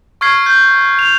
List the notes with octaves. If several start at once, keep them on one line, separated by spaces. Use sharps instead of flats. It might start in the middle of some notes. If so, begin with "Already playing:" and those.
C#6 F6 G#6 C7
G6
F7